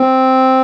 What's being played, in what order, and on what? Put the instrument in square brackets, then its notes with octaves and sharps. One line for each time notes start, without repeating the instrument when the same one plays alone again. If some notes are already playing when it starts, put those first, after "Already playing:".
Already playing: [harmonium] C4